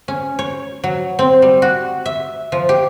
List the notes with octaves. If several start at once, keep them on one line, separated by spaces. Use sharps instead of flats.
C#4
C#5
F#3
C4
G3
F#4
E5
F3
G4